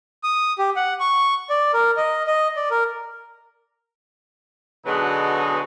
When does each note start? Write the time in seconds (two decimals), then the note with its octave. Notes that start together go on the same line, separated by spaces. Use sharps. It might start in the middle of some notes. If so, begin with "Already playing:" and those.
0.23 D#6
0.59 G4
0.76 F#5
1.00 C#6
1.50 D5
1.74 A#4
1.97 D#5
2.27 D#5
2.56 D5
2.71 A#4
4.85 B2 D3 F#3 G#3 B3 D#4